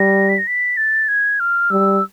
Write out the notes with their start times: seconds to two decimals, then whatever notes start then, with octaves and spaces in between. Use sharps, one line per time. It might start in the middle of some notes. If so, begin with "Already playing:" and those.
Already playing: G3 A#6
0.29 B6
0.38 A#6
0.47 B6
0.77 A6
1.08 G#6
1.40 F6
1.71 G3 E6